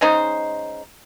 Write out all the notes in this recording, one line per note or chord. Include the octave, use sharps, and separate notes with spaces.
C#3 G#3 D#4 C5